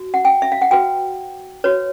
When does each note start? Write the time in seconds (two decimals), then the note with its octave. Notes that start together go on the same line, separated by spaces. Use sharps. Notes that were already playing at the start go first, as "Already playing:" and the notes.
Already playing: F#4
0.14 F#5
0.25 G5
0.42 E5
0.52 F5
0.62 F#5
0.71 F#4 B4 G5
1.64 F#4 B4 C#5